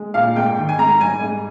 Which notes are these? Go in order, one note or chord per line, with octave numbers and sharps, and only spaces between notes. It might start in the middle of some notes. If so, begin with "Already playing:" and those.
Already playing: G#3
A#2 F5
G#2 G5
D#3
G#5
G#2 A#5
G3 G#5
G#2